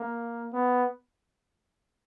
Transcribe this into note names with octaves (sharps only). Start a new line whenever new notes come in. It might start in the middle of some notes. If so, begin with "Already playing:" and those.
Already playing: A#3
B3